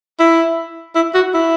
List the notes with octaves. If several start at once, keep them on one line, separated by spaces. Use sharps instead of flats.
E4
E4
F#4
E4